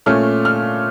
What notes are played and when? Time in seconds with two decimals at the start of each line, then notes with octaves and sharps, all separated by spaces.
0.06 A#2 A3 C#4 F6
0.45 F6